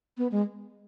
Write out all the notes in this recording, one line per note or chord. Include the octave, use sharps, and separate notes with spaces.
B3
G#3